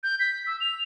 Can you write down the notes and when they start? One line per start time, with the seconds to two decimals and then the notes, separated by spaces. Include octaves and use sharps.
0.03 G6
0.20 B6
0.47 E6
0.61 F7